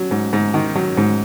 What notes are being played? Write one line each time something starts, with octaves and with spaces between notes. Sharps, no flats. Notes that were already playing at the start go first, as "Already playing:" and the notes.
Already playing: F#3
G#2
G#2
D#3
F#3
G#2